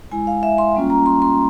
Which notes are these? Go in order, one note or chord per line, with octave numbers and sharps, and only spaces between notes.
G#3 E4 G#5
F5
E5
C6
G3 A#3 C#4 F4
A#5
C6
C6